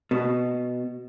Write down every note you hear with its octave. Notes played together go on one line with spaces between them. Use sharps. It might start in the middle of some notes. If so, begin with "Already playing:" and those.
B2